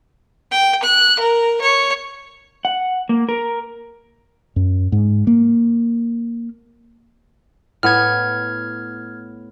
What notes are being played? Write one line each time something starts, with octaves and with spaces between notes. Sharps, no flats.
G5
F#6
A#4
C#5
F#5
A#3
A#4
F#2
G#2
A#3
A2 B3 F#5 F6 G#6